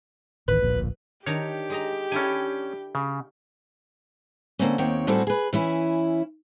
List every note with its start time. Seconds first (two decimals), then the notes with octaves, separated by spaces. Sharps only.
0.48 D1 A1 D#3 B4
0.62 D1 A#1 A#2
1.26 D#3 D4 G4 C#5 A#5
1.70 G#3 D#5 A#5
2.12 C#4 D4 E4 A4 G#5
2.95 C#3
4.59 D3 A#3 C4 C#4
4.78 D#2 D#3 C4 C#5 G5
5.07 A2 G3 C4 F#4 G#4 A4
5.27 G#4 B4
5.53 E3 C#4 E4